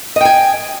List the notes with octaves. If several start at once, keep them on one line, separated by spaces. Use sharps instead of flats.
D#5 G5 G#5